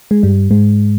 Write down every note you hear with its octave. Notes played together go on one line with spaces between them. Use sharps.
G#3
G2 G3
G#2 G#3